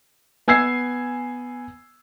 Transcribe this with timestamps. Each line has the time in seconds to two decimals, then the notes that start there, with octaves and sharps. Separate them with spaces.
0.48 B3 G#5 E6 G#6 C7